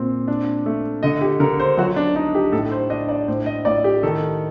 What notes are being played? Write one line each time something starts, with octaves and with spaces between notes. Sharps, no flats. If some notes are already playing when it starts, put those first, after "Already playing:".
Already playing: A#2 C4
D4
A3
D3 D#5
G4
D3 A#4
C5
F#3 F#4
D4
D4 D#4
G4
A2 A4
C5
D4 D#5
D5
A2 C5
D#5
A2 D5
G4
D#3 A4